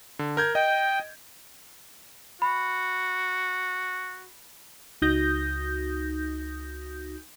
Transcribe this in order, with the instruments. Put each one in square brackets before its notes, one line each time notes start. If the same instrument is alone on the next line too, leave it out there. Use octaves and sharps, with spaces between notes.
[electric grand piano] D3
A#4 G6 G#6
[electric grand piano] D#5 [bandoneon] G5
[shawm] F#4 [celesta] B5
[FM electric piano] C#2 D#4 F#4 D#6 G6 A#6